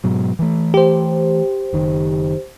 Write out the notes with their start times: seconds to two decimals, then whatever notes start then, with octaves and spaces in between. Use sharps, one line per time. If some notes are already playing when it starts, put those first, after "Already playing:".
0.04 G#2 B2 F#3
0.39 E3 A3
0.74 G4 C5
1.73 F#1 D#3